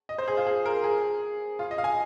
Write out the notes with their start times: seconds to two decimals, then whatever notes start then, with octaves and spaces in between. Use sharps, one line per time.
0.09 D#5
0.18 C5
0.28 G#4
0.37 F4
0.47 G#4
0.66 A#4
0.84 G#4
1.59 F4
1.71 D#5
1.78 F5
1.84 G#5